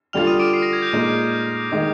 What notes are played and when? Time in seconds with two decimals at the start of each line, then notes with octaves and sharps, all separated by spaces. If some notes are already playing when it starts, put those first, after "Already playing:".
0.13 D3 G3 D4 F4 F6 F7
0.27 D#6 D#7
0.39 D6 D7
0.53 C7
0.62 A#6
0.73 G#6
0.82 G6
0.93 A#2 G#3 D#4
1.71 D#3 G#3 D#4 D#6